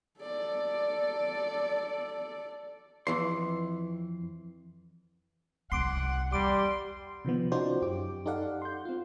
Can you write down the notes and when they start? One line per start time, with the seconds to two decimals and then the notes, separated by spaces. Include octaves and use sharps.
0.20 A4 D5
3.07 F2 E3 C6
5.72 C2 C#4 F#5 C6 D6
6.32 E2 G3 C6 D6
7.25 C3 D#3 F3 B3
7.52 C#4 D#4 F4 F#4 C5 D5
7.82 F#2 G4 D6
8.26 D#4 G4 A4 D5 F5 F#5
8.62 C6 G6
8.85 C4 F4